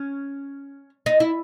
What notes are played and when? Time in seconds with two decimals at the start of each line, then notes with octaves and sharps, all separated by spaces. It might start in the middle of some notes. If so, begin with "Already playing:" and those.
Already playing: C#4
1.06 D#4
1.20 E4